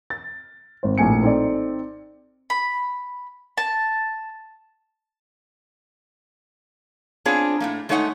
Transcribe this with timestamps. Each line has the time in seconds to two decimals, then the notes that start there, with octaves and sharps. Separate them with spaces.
0.10 A6
0.83 G#1 C5
0.98 A#1 A2 G#5 C#7
1.23 C4 D#4 A4 D5
2.50 B5
3.57 A5
7.25 B3 C4 D4 F4 G#4 C#5
7.60 A2 A3 A#3
7.89 G#3 A3 D#4 C#5 F5 F#5